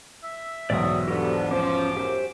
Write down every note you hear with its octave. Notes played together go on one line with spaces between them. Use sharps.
E5
B1 E2 G#2 C3 F#3 D5 D#6
F3 B3 D4 F#4 G4 A4
F3 C#4 C5 D6
F#2 G4 C5